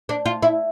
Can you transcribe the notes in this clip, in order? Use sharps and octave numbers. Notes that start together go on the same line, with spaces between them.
D4
F4
E4